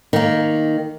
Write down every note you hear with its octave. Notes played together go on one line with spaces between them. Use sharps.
D#3 A#3